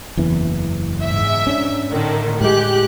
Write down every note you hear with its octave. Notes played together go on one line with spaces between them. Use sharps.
F#1 E2 E3
G#2 E5
C#4 D4
A2 D3 D#3
A2 G#3 G4 F#6